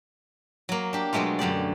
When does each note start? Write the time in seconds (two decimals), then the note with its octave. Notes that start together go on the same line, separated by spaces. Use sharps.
0.69 F#3 A#3
0.93 D4 G4
1.13 B2 F#3 G#3 A3 F4
1.39 F#2 D3 G4 D5